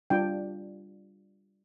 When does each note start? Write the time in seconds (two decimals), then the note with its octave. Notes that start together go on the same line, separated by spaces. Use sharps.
0.10 G3 D4 F4 G5